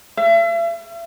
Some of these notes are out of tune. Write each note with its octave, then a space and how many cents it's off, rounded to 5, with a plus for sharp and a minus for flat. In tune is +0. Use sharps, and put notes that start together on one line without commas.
E5 +40